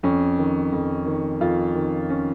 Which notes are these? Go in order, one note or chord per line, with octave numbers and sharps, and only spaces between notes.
F2 C#4
D#3
F2
D#3
F2 F4
D#3
C#4